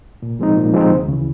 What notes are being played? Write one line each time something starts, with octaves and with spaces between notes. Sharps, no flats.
A#2
F3 G#3 C4 D#4
A#2
F3 G#3 C4 D#4
D2
C#3 E3